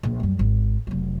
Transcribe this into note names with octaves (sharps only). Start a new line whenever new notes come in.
A#1
F#2 G3
G#1
F1 F#3